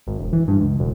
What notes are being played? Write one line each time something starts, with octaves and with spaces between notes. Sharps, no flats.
G#1
E1
E3
G2
C#2
E1